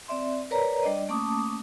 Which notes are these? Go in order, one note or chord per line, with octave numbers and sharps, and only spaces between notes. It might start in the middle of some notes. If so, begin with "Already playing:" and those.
C4 D5 E5 C6
A#4 B4 C#5 D5 A#5
G3 D4 D5 D#5
A3 A#3 C#4 A5 D6 D#6